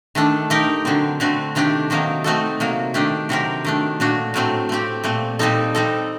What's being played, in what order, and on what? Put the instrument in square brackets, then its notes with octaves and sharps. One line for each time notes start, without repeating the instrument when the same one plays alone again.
[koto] D#3 A3 D4 A4
A3 D#4 G4 A#4
D3 F#3 C4
D3 A3 C4 F#4
C3 D#3 A3 D4 G4
C3 D#3 F#3 A#3 D#4
A3 C4 D#4 F#4 A4
C3 F#3 A#3
D#3 A3 D4 G4
C3 F#3 C4 G4 A#4
D#3 A3 D4
A#2 A3 D4 F#4
A2 F#3 A3 C4
A3 C4 G4
A#2 A3 C4
A#2 G3 C4 D#4 A4
G3 C4 D#4 A4